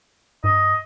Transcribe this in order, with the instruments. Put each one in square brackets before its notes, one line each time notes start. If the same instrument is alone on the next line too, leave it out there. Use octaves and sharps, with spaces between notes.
[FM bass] G2 [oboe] D#5